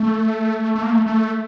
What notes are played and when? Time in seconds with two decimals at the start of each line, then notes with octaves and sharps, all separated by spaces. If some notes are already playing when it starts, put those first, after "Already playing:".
Already playing: A3
0.75 A3
0.83 A#3
0.90 A3
1.06 A3